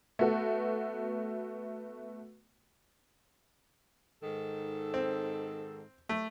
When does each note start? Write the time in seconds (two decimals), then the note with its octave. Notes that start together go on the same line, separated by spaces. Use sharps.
0.19 A3 B3 F#4 A4
4.22 G#2 D#3 A4
4.94 C4
6.09 A3